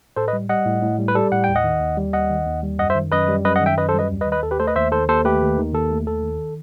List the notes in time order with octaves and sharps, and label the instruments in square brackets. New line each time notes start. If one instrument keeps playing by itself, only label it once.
[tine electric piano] A2 A4 C5
B4 D#5
G3
G3 D#5 F#5
A2
A2
G3
B4
G3 A4
A2 F#5
D#2 G5
D#5 F#5
D#3
D#2
G3
D#2 D#5 F#5
D#3
D#2
G3
F#2 D#5 F#5
C5 E5
D#3
F#2 B4 D#5
G3
F#2 B4 D#5
D#5 F#5
D#3
E5 G5
F#2 B4 D#5
A4 C5
G3
B4 D#5
D#2
B4 D#5
D#3
B4 D#5
D#2 A4
G4 B4
A3 A4 C5
B4 D#5
D#2 C5 E5
D#3 A4 C5
D#2 A4 C5
A3 G4 B4
D#2
D#3
D#2 A4
A3
D#2 A4
D#3